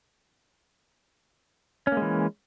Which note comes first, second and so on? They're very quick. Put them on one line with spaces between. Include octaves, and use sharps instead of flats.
C#4 A#3 G#3 E3